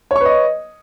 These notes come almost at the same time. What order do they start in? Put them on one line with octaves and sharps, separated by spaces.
C#5 C#6 B4 D#5